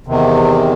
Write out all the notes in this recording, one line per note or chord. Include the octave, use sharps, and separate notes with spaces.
E2 C3 D#3